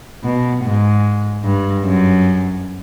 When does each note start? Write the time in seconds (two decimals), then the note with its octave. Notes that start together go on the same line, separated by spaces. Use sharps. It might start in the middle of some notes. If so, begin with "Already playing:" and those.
0.24 B2
0.64 G#2
1.45 G2
1.86 F#2